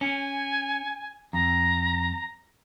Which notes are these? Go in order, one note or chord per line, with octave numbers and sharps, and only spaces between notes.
C#4 G#5
F2 A#5